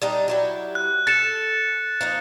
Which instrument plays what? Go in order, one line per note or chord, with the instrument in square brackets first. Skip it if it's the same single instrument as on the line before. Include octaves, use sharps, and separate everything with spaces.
[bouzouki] G3 D4 D#4
F#3 E4 G4
[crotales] F#6
[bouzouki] A4 [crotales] A6 C#7 E7
[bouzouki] F3 A#3 D#4